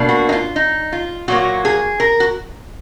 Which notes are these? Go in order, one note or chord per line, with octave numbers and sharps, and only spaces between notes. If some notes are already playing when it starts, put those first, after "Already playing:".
Already playing: B2 A#3 D4
F#4
D#4
F4
D#4
F4
A#2 F#3 A#3 F#4
G#4
A#4
F#4